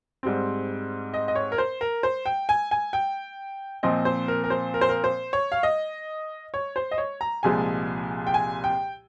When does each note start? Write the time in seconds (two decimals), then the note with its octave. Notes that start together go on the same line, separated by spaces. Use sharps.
0.23 G#2 G3 C4
1.14 D#5
1.28 D#5
1.36 C#5
1.52 A#4
1.58 C5
1.81 A#4
2.03 C5
2.26 G5
2.49 G#5
2.71 G#5
2.93 G5
3.83 A#2 F3 C4 D#5
4.05 C5
4.28 A#4
4.44 A#4
4.50 C5
4.74 A#4
4.81 C5
4.89 A#4
5.04 C5
5.33 C#5
5.52 F5
5.63 D#5
6.54 C#5
6.76 C5
6.91 D#5
6.98 C#5
7.21 A#5
7.43 C2 A#2 F3 G#3 G#5
8.27 G5
8.34 G#5
8.64 G5